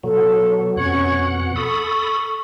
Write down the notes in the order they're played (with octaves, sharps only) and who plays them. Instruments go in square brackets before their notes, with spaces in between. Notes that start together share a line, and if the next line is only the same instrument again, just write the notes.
[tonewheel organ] B2 F#3 [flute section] A4
[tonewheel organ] F2 B2 F#5 [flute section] C#4 C#6 G#6
[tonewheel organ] A4 B5 D#6 [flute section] C#6